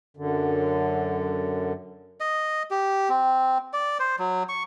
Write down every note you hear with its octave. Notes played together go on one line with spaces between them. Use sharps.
F#2 D3
D#5
G4
C4
D5
C5
F#3
C#6